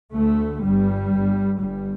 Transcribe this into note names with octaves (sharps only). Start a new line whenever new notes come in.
D2 A3
G1 G2 G3
G1 G2
G1 G2 G3